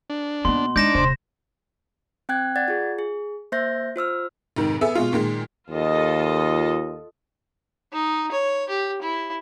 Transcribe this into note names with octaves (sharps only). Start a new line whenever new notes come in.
D4
B2 A#3 B3 C6
G#3 D4 D#4 D6 G6 A#6 E7
D#1 C3 C5
C4 G5 F#6 G#6
D5 F#5 G#6 A6
F4 G#4
G#4
A#3 C5 E5 G6 A#6
F4 C5 E6 F6
F1 G#2 D#3
B3 G#4 A4 E5
B2 G#3 F4
A#2 D#3 G#3
D#2 F4 A4 D#5
D#4
C#5
G4
E4